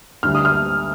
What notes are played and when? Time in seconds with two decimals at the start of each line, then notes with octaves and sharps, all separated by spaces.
0.23 D2 D3 G3 F6
0.35 D#6
0.45 F6